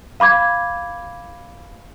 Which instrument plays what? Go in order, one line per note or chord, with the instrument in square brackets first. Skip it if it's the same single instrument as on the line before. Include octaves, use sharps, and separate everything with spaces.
[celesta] F5 B5 D6 G#6